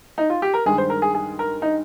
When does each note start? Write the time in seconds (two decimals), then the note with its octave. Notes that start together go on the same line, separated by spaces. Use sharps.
0.18 D#4
0.30 F4
0.42 G4
0.54 A#4
0.66 G2 D#3 G#3 G#4
0.78 C5
0.90 A#4
1.02 G#4
1.14 G#4
1.39 A#4
1.62 D#4